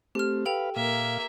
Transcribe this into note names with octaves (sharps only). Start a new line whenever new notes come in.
A3 C4 G4 F6
A4 B4 F5 G5 F7
A#2 A#3 E5 F5